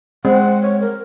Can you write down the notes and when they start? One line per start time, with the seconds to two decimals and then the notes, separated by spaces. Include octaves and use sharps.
0.25 G#3 C4 F#5
0.62 C#5
0.81 A#4